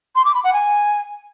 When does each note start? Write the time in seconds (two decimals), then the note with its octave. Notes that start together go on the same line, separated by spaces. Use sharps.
0.16 C6
0.25 D6
0.34 B5
0.44 F#5
0.53 G#5